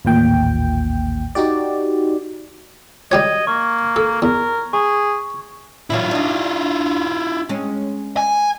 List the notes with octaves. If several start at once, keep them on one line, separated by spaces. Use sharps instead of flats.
A1 D#2 A#2 G5
D#4 F#4 G4 D5
G3 G4 C#5 D#5 G#6
A#3 C#6
A4
E2 A#4
G#4 C#6
A#2 E3 F#3 E4 F4
D4 D#4
G#3 C#4
G#5